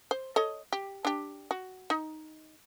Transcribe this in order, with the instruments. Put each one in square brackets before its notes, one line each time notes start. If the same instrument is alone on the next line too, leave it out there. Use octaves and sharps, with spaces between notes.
[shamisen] C5
A4 C#5 D#5
G4
D4 G4
F#4
D#4